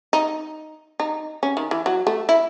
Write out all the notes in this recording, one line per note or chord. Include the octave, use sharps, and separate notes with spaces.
D#4
D#4
C#4
D#3
E3
F#3
A3
E4